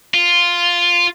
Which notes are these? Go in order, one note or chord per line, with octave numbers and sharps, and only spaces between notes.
F4